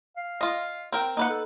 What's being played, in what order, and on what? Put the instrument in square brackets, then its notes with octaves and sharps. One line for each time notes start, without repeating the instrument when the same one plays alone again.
[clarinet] F5
[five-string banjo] F4 D#5
C4 A#4 G5
[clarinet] A#3 [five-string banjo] D#4 B4 F#5
[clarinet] A4